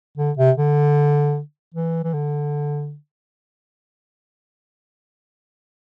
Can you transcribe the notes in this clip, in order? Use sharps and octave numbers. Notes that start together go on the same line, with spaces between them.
D3
C3
D3
E3
E3
D3